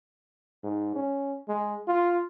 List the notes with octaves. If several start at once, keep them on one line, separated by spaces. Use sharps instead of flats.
G#2
C#4
G#3
F4